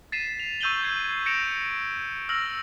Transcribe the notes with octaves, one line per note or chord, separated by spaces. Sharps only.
A6 B6 C7 D#7 E7
F7
C#6 E6 G6 D#7 F#7 G7
G#6 C7
A#6 C#7 D7 E7 F7
E6 F6 A#6 F#7